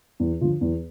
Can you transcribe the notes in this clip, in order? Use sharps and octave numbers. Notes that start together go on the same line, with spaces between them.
E2
D3 F3 F4
E2